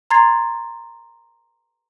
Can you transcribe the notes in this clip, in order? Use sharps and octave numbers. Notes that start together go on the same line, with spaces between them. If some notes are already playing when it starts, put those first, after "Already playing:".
A#5 C6 G#6 A6 C7